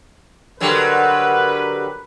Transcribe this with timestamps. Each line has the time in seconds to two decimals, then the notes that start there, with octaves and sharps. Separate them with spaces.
0.60 D3 F#3 G3 A#4 B4